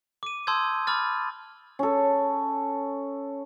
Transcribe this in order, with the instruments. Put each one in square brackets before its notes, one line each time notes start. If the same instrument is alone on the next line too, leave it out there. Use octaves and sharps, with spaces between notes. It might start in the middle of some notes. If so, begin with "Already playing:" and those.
[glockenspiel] D6 D#7
A5 C6 D#6 E6 G6 G#6
B5 D6 F6 A6
[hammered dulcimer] C#4 A4